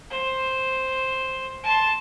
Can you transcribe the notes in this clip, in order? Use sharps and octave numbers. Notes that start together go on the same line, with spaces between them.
C5
A5 C6